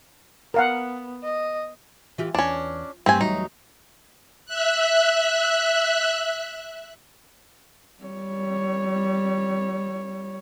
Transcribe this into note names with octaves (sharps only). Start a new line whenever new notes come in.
B3 A#4 F5 F#5
D#5
E3 F4 G4
E2 C#4 D4
G2 A3 C4 G4 G#5
E2 F#3 D#4
E5 F#6
G3 C#5